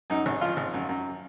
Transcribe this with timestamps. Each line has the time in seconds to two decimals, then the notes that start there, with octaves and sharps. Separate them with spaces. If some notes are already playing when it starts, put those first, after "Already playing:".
0.10 F#2 D#4
0.26 G#1
0.41 F3 F4
0.57 G#1
0.74 F#2
0.89 F#2